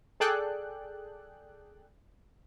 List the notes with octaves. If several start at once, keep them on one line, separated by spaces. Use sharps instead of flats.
G#4 A4 D5 G5 F#6